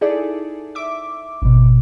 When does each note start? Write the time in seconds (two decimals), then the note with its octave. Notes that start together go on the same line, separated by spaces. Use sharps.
0.01 D#4 E4 G#4 A4 D5
0.75 E5 D6
1.42 G#1 B2